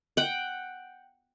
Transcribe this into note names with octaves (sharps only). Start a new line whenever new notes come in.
F#5 G5